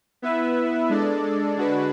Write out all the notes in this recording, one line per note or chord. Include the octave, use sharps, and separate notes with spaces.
B3 E4 B4 E5
G#3 D4 A4 D5
D3 G#3 D4 F#4 B4